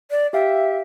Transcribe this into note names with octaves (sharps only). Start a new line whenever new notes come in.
D5
G4 E5 F5 G5